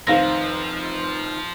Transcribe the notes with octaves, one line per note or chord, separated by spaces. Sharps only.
F1 D#3 F3 C5 F5 A#6